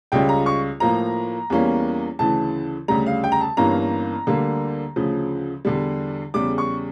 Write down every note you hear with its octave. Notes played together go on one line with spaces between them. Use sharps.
C#2 C#3 G3 C#4 F4 G5
A#5
C#6
A2 F3 A#3 A#5
E2 E3 G3 A#3 C#4
D2 C#3 E3 A5
D2 C#3 G3 A#5
F5
G5
A#5
A5
G1 G2 E3 A#3 C#4 A#5
D2 D3 G3 A#3
D2 C#3 F3
E2 D3 G3
E2 C#3 G3 D6
C#6